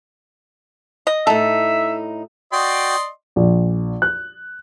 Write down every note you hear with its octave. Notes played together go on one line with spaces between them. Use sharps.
D#5
A2 D#4 A4 E5
F#4 D5 D#5 G5 C6
A#1
F#6